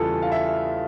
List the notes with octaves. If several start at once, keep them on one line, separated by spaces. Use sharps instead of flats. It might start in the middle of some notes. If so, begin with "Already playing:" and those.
Already playing: E2 C#3 E3 G3 F4 A4
F5
E5